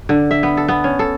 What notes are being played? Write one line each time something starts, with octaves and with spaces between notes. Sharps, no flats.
D3
E5
B3
A4
B3
C#4
A4